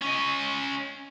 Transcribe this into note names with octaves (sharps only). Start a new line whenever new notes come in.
C#4 D#5